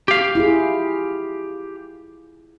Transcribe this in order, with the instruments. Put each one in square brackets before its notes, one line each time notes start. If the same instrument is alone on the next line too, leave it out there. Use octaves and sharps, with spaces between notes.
[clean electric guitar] G4 F5
[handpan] E4 F4 G#4